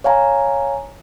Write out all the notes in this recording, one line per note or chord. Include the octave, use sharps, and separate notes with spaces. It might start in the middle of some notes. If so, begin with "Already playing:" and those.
C#5 F5 G#5 A#5